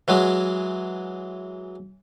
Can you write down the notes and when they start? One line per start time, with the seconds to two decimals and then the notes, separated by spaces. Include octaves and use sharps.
0.08 E3 F#3 G#3